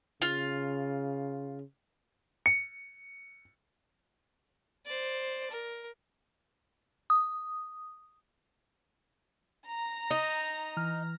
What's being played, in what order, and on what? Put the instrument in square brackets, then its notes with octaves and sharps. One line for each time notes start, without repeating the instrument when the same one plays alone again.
[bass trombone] C#3 [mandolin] F4
[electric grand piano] C#7
[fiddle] C5 D5
A#4
[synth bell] D#6
[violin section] A#5
[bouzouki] D#4
[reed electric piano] E3 F6